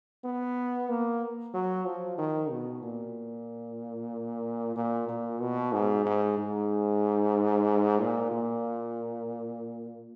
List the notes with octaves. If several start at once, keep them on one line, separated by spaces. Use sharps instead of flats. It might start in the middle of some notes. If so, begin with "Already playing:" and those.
B3
A#3
F#3
F3
D#3
B2
A#2
A#2
A#2
B2
G#2
G#2
G#2
A#2
A#2